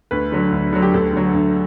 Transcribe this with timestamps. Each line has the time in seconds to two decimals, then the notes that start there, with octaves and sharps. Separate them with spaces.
0.11 D2 B4
0.32 D3 F#3
0.52 D2
0.73 D3 F#3
0.82 G4
0.94 D2 A4
1.13 D3 F#3
1.34 D2